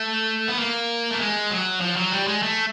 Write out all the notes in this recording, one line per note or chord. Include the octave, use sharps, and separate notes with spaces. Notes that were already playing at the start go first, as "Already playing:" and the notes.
Already playing: A3
B3
A#3
A3
G#3
F#3
F3
F#3
G3
G#3
A3